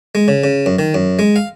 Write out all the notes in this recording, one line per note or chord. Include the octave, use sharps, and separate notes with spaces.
G#3
C#3
C#3
F#2
D#3
F#2
G#3
F5